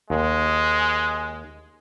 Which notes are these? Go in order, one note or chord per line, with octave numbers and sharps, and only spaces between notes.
D#2 G#3